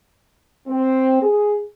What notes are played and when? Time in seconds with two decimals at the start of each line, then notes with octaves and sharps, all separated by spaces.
0.67 C4
1.22 G#4